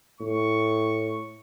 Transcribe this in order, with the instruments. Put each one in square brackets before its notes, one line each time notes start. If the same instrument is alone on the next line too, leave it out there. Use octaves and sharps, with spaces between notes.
[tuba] A2 [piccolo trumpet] C#6